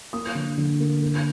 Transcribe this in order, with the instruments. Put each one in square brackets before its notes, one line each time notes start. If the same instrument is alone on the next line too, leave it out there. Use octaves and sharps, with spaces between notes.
[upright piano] A#3 D#6
D3
D3
A#3
A#3